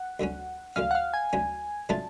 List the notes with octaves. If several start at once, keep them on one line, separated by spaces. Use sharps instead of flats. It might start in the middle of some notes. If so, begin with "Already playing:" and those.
Already playing: F#5
D2 D3 F#3 C#4
D2 D3 F#3 C#4 F5
F#5
F5
G#5
D2 D3 F#3 C#4
C#3 F#3 A3 D4 F4 A5